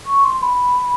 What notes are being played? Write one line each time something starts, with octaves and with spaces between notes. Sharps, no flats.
C#6
C6
B5